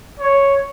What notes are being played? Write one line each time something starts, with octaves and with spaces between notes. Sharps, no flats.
C#5